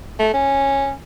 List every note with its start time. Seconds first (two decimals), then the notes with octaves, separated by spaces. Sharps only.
0.19 A3
0.34 C#4